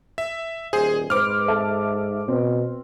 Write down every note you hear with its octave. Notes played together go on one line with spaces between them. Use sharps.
E5
D#1 G#4 C5
G#2 B4 C5 D6 F6
A4 E5 A5
B2 C4